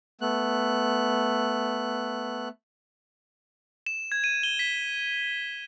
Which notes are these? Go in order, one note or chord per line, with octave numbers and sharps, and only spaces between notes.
A3 B3 F#6
E7
G#6
D#7
G7
B6